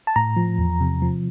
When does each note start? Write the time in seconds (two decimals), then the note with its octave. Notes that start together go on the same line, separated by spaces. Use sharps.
0.07 A5
0.16 A2 A#5
0.36 F3
0.58 E2
0.81 C3
1.02 F3